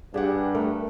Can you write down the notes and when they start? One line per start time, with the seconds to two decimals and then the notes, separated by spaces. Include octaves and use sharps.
0.14 G2 D4 G4 G#4 F#5
0.55 A3 A#4